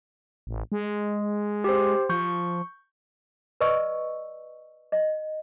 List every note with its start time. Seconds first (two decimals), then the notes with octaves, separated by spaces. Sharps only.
0.47 A1
0.72 G#3
1.64 G4 C5
2.09 F3 C#6 G6
3.60 B4 D5 D#5 C#6 E6
4.92 D#5